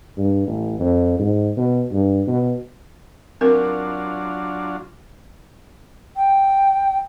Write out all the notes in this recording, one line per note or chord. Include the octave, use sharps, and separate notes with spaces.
G2
A1
F2
G#2
B2
G2
B2
F#3 C4 D4 F4 A#4
G5